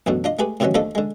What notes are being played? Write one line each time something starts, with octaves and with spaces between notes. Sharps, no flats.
A1 F#2 B2 D3
D4 F4 D#5
A3 G4 G#4 B4
A2 C3 D#3 E3 F#3 C#4
D#2 F3 A3 D4 A4 D#5
D3 G#3